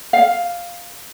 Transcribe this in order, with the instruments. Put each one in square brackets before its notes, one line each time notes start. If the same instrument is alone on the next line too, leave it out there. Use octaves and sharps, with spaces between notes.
[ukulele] F5